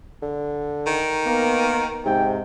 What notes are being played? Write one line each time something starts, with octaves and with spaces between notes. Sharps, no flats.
D3
D#3
A#3 B3 A#4
G#2 C3 G5